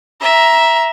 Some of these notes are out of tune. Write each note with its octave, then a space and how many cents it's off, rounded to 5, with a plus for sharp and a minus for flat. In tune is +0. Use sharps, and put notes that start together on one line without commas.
E5 +0 A#5 +20